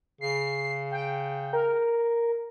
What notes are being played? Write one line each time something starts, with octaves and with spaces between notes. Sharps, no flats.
C#3 C7
G5
A#4